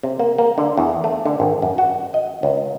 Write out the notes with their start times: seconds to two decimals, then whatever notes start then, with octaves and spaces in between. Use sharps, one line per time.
0.03 C3
0.19 A#3
0.38 A#3
0.58 D3
0.77 E2
1.04 A3
1.26 D3
1.40 G#1
1.62 F#2
1.78 F#4
2.14 D#5
2.43 C#2